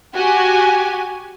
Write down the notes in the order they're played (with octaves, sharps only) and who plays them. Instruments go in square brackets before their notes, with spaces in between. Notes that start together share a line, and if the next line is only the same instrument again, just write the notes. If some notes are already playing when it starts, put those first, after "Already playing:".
[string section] F#4 G4 G#5